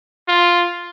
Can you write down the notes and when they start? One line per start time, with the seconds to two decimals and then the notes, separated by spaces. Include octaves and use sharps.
0.28 F4